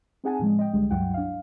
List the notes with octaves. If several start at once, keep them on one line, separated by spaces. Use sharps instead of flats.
C4 D#4 G#4 F#5 G#5 A5
A2 C#3 F3 G#3
D#5 G5
C2 D3 G3 G#3
C#2 G2 F#3 E4 F#5 G5
D4 F5